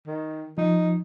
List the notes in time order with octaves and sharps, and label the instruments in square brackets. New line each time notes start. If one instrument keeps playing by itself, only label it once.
[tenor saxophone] D#3
[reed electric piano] F3 [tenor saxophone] D#4